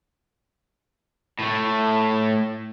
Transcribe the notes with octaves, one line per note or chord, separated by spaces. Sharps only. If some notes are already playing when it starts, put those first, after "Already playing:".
A2 A3